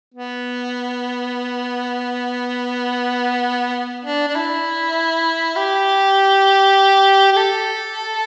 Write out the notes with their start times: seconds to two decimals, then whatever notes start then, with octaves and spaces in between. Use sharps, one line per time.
0.14 B3
4.05 D4
4.28 D4
4.36 E4
5.56 G4
7.32 G4
7.37 A4